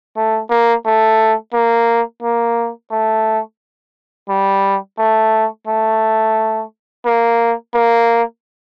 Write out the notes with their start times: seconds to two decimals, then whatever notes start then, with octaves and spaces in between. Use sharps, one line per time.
0.17 A3
0.50 A#3
0.86 A3
1.53 A#3
2.22 A#3
2.91 A3
4.29 G3
4.98 A3
5.67 A3
7.05 A#3
7.74 A#3